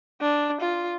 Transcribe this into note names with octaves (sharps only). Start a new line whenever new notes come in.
D4
F4